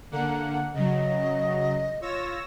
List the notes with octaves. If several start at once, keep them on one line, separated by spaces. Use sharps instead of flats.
D3 A#3 F#5
C#3 F#3 D#5
F4 C#5 E6 A#6